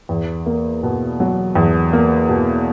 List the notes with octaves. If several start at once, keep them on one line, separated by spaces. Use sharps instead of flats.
E2
A#3
B2
F#3
E2
A#3
B2